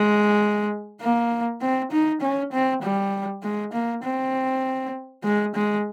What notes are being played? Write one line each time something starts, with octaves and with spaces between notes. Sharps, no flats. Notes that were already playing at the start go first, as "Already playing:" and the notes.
Already playing: G#3
A#3
C4
D#4
C#4
C4
G3
G#3
A#3
C4
G#3
G#3